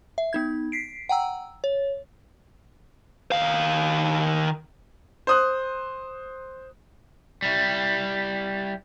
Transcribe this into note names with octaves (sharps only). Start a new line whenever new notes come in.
E5
B3 D#4 G#6
B6 C7 D7
F#5 G5 A#5 E6
C#5
D#3 F5
C5 D#6 F#6
G3 E4